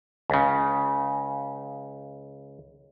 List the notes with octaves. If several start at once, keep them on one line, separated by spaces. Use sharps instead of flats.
C#2 C#3